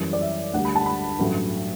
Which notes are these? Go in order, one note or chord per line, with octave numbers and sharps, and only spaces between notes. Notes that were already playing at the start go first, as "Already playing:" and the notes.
Already playing: F#2 E3 G3 C#5
D5
E5
D2 D3 G3 F#5
B5
A5
B5
A1 G2 F#3 A3